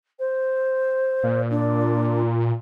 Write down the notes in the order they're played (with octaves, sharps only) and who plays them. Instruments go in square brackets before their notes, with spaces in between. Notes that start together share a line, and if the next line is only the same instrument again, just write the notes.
[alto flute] C5
[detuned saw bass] A#2
[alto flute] D4